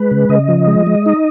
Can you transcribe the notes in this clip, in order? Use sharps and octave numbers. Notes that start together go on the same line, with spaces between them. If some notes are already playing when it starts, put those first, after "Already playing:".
Already playing: G#3 B4
C#3
C#3 D#5
F3
G#3
G#3
D#4